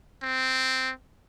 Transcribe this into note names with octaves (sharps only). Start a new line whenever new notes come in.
C4